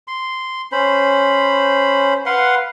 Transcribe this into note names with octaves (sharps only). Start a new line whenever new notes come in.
C6
C#4 C5 B5
B4 F5 F#5 C6